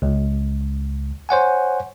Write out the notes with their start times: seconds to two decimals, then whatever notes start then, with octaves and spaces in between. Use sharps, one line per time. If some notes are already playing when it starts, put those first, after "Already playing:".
0.02 C#2
1.29 C5 C#5 F#5 G#5